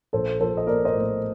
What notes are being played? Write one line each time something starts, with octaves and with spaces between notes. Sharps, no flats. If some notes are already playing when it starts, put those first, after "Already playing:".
A#1 A4 C5
F3 A4 C5
D#5
A#3 A#4 D5
C5 D#5
A2